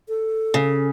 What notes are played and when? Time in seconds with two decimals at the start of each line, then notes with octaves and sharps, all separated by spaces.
0.09 A4
0.54 C#3